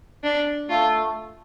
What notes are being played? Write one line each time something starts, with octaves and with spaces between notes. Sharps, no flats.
D4
A3 F4